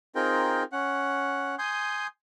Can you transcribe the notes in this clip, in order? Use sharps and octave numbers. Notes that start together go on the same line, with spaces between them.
C4 D#4 F4 G#4 A#4 G5
C#4 F#5
G#5 C6 D#6 G6